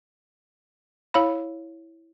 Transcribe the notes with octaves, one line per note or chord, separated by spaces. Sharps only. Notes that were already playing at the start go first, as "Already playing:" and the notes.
E4 C#5 F5 B5